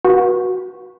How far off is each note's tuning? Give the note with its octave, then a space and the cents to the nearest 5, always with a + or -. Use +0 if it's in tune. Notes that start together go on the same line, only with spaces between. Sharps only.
F#4 +0 B4 -35 F#5 -40